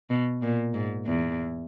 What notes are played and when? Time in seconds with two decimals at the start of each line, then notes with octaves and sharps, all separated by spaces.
0.10 B2
0.42 A#2
0.74 G#2
1.07 E2